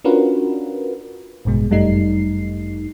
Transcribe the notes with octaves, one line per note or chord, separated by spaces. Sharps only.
C#4 D4 F4 F#4 A#4 B4
A1 G2 B2 G#3
G1 F#2 G3 A3 D#4 C7